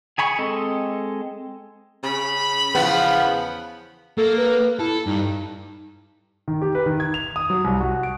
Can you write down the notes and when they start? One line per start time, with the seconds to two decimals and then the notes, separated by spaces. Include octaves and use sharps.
0.18 G#4 G#5 B5 C#6
0.38 G#3 C4 A4 D#5
2.03 C#3 B5
2.75 E2 C#3 F3 B3
4.18 A#3 A4
4.38 B4
4.79 E4 A4
5.07 G2 D#4
6.48 D#3
6.62 G4
6.75 B4
6.86 D#3
7.00 G#6
7.14 F7
7.36 D#6
7.50 F#3
7.64 C2
7.80 F#4
8.03 D7